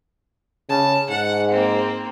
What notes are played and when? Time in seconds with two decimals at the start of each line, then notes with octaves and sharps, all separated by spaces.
0.70 C#3 A5
1.10 G#2 F#5
1.51 A#3 C4